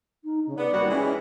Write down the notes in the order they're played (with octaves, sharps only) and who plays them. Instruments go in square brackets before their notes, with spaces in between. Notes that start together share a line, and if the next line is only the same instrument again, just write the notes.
[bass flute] D#4
C#3
[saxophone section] B3 [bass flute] D5
[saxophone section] D#2 F#4 [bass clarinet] G3
[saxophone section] E3 G#3 [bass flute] C#4